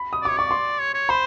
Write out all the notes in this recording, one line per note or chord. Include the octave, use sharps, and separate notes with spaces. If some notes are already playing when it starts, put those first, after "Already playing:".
Already playing: B5
D#6
D5
C#5 D6
D5 C#6
C6
C#5
C#5
C5 B5